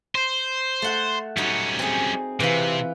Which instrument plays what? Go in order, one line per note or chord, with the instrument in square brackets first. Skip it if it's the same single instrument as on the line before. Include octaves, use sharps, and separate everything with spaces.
[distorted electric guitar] C5
[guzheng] A3 F#5
[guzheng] F#3 D#4 [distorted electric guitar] G3 C#4
[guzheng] C4 G#4
[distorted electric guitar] C3 [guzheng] E3 F4